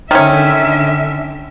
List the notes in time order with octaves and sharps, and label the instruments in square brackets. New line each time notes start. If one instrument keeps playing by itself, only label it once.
[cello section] D3 E5 [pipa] D#3 C#4